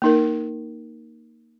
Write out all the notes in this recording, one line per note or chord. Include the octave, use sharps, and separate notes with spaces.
A#3 D#4 A#4